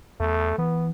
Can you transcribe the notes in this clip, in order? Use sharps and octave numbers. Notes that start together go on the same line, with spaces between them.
E2 A3
E3 B3